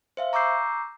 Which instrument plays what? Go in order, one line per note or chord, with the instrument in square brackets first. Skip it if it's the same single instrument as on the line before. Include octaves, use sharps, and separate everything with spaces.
[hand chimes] C5 E5 F5
A#5 C#6 D6 E6 G6 C7